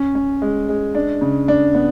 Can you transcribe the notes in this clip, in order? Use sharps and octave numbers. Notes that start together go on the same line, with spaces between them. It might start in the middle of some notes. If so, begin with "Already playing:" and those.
Already playing: C#4
C#4
G#3
G#3
D4
C#3
D4
B3